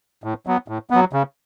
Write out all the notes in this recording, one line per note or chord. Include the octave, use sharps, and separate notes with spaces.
A2
F#3 B3
A2
F#3 B3
C#3